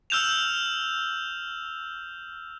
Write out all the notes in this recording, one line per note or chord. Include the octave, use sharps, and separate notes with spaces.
E6 F6 G6 E7 F7